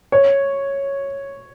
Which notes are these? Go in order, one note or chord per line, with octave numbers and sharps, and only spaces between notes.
C#5